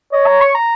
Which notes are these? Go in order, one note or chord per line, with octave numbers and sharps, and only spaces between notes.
C#5 D#5
A#5
C#6
A#5